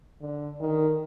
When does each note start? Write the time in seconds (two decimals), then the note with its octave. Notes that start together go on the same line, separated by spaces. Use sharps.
0.21 D3
0.60 D#3